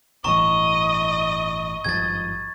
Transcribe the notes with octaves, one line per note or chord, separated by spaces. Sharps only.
G1 A2 E3 D#5 A#5 C#6
G#1 G2 F3 G#6 A6